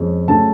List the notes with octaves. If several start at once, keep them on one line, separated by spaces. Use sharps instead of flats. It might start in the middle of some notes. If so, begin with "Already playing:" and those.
Already playing: F2 G#3 C#4
C#3 F#3 A3 A5